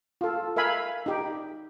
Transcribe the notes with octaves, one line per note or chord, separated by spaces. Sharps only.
F4 A4
A#4 E5 F5 G#5 B5
D#4 G4